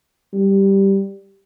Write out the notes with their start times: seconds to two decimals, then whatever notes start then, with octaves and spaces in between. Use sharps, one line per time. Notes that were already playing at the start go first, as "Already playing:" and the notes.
0.34 G3